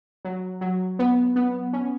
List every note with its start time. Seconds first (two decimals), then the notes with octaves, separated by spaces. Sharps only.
0.25 F#3
0.61 F#3
0.99 B3
1.36 B3
1.73 C#4